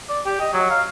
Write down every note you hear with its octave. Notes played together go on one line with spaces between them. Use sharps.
D5
G4
D#5
F#3
F5